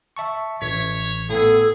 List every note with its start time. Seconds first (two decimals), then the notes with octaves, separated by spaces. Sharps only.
0.17 E5 A5 C#6
0.62 A1 C#5 B6
1.30 A2 B3 G#4 A4